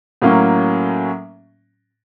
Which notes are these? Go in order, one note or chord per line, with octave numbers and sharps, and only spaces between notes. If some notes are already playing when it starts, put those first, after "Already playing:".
A2 F#3 A#3 C#4